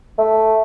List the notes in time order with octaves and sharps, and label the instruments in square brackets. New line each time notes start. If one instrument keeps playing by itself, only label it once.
[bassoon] A3